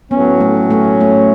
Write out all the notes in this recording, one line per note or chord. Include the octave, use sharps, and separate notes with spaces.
A2 F#3 B3 C#4
A3
A3
A3